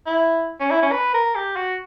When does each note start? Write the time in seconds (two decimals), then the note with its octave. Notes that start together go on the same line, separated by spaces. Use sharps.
0.07 E4
0.60 C#4
0.71 E4
0.82 C#4
0.92 B4
1.14 A#4
1.35 G4
1.56 F#4